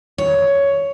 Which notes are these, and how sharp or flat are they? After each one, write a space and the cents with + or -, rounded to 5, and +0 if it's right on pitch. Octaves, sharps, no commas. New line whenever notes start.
C#5 +10